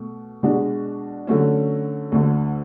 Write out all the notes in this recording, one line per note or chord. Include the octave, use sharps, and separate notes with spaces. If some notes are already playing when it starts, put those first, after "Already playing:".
Already playing: B2 A3
B2 G#3 D4 F#4
D3 F#3 A3 C#4
D2 D3 A3